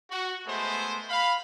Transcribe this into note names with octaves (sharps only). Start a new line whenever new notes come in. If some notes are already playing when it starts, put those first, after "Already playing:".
F#4
G#3 A3 B3 C5
F5 B5